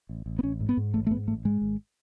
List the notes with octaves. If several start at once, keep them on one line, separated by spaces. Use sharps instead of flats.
A1
A1
B3
A1 C#4
G#2
B3
G#2
A1 A3
A3
G#2 B3
A1 A3
G#2 G#3
G#1